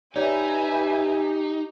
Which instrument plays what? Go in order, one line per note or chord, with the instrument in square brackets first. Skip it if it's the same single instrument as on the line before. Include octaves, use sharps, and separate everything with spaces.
[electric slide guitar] D#4 [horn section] G4 [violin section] B4 E5 G#5 [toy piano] C#5 D5